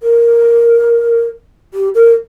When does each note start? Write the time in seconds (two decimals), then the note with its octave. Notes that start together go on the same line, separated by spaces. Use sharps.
0.03 A#4
1.74 G4
1.95 A#4